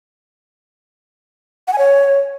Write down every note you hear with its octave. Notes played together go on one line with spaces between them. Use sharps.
F#5
G#5
C#5